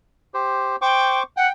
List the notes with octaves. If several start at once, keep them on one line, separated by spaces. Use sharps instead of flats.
G4 C5
C5 G5 C#6 D6
F#5 G5